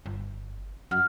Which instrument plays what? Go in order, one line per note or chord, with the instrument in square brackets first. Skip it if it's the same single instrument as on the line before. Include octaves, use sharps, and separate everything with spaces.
[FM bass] G1
[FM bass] F#2 [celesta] F#5 F6